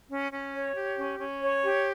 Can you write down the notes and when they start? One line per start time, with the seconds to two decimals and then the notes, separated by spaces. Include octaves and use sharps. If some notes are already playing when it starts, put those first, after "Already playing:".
0.11 C#4
0.31 C#4
0.54 C#5
0.75 G4
0.97 C#4
1.19 C#4
1.41 C#5
1.63 G4